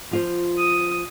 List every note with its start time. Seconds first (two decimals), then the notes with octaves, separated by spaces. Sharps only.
0.11 F3 F4 C5
0.57 D#6